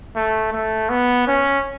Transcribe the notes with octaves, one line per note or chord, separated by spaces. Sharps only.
A3
A3
B3
C#4